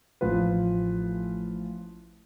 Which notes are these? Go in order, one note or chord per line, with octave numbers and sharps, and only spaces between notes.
A1 F3 F4 B4